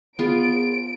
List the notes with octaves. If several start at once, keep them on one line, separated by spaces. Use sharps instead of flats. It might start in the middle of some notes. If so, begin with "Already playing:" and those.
B3 F4 G#4 D7